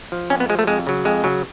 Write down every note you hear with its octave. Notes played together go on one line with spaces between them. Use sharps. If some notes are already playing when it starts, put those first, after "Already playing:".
F3
F2 C#4
B3
F3 G#3
A3
F2 G#3
C#3 F#3
F2 G#3
C#3 F#3